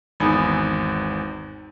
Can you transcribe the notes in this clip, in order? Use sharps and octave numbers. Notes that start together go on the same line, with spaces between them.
G#1 E2 D#4 G#5 B5